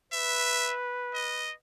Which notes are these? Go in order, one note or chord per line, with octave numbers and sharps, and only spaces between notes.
B4 E5
D#5